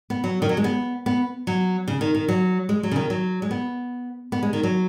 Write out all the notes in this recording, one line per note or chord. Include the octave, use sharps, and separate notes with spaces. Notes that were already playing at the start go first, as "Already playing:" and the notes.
B3
F#3
D#3
F#3
G#3
B3
B3
F#3
C#3
D#3
D#3
F#3
G#3
F#3
C#3
D#3
F#3
G#3
B3
B3
G#3
D#3
F#3